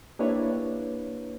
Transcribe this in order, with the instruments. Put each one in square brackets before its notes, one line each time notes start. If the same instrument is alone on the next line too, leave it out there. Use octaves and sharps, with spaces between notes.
[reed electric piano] A#3 D4 E4 G4 B4 C#5